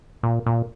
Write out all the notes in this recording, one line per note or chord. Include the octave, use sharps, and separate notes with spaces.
A#2
A#2